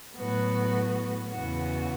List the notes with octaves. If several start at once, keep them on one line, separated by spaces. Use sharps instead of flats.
A2 F#3 B3 F#4 B4
E2 C#3 E3 B3 F#4